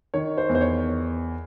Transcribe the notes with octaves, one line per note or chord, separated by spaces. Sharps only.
D#3 C#5
C5
E2
C5
C#5